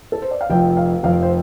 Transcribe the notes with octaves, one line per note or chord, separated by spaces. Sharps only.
A4
C5
D5
F5
F1 F2 F3 G5
F5
F1 F2 F3 F5
C5